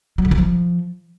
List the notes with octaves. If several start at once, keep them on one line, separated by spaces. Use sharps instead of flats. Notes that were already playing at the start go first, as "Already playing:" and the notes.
F#3
D3
E3
F3